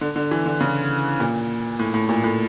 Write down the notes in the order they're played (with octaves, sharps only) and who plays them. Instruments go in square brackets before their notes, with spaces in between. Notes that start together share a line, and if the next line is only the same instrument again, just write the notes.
[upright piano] D3
D3
E3
D3
C#3
A#2
A2
A2
A#2
A2